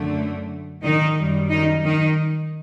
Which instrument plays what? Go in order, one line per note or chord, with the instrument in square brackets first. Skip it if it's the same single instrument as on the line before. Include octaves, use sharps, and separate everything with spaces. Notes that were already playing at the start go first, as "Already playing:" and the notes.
Already playing: [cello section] F#2 D3 A3
D#3 D#4
F#2 D#3 G3
D#3 D#4
D#3 D#4